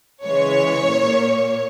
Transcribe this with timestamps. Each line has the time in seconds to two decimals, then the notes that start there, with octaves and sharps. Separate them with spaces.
0.23 C#3 E3 G#3 C#5
0.88 A#2 A#3